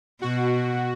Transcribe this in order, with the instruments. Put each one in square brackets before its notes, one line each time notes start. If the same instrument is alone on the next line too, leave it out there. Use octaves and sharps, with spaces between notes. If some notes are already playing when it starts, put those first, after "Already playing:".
[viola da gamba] B2 [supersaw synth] F#4